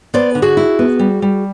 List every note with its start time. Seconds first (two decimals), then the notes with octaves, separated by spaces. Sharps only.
0.14 B3 C5 D5
0.35 D3
0.42 F#4 G#4
0.57 E4
0.79 B3
0.99 G3
1.22 G3